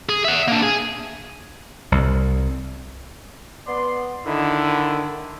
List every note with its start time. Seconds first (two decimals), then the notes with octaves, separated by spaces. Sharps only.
0.09 G#4
0.25 E5 F#5
0.48 A#3 D4
0.63 G#4
1.92 C2
3.67 B3 D5 C6
4.26 D3 D#3 E4